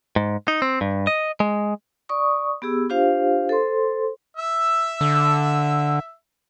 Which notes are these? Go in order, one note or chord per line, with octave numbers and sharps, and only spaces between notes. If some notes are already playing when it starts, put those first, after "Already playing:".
G#2
D#4
C4
G2
D#5
G#3
D5 C#6 D#6
B3 G4 G#4 E6
D4 F4 G4 C5 F5
A4 C5 C6
E5 E6
D3